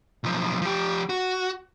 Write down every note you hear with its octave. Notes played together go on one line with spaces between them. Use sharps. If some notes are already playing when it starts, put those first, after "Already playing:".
B1 F3
F3 G4
F#4